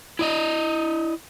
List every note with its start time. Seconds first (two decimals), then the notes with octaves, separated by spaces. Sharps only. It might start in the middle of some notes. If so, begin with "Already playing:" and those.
0.19 E4 D5 D#5